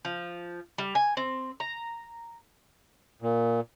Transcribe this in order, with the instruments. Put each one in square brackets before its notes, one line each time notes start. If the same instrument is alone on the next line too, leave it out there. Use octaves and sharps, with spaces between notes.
[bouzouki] F3
G3
G#5
C4
A#5
[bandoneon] A#2